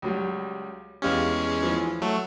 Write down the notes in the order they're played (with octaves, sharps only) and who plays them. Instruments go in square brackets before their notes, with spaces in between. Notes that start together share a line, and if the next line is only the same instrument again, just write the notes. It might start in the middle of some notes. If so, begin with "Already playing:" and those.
[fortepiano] C#2 F#3 G3
[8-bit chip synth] E2 G#3 C#4 [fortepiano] G4 F5
[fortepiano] E3 F3
[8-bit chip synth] F#3 A3